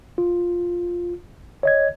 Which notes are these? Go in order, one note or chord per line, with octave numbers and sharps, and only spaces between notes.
F4
C#5 D#5 G#6